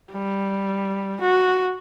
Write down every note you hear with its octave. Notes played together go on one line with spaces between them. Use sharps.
G3
F#4